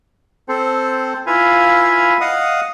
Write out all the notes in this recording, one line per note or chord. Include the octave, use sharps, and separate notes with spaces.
C4 A4 C5
E4 F4 B4 F5 G#5
D#5 F5 F#5 D#6